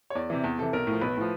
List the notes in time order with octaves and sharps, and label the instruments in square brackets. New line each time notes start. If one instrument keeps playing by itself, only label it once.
[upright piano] C#5
E2 D5
C3 E3
E2
C3 E3 A4
B1 A#4
A2 F3
B1 B4
A2 F3